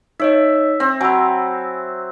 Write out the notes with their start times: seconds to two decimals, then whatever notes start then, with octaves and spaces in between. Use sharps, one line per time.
0.20 D#4 C#5 D#5 E5
0.80 C4
1.01 F#3 G#5 B5